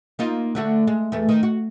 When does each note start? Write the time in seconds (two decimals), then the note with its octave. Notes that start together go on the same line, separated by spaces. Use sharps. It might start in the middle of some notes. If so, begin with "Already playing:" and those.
0.19 A#3 D#4 F4
0.55 D3 A3 F#4
0.87 G#3
1.12 E2 A3
1.29 D#3
1.43 F#4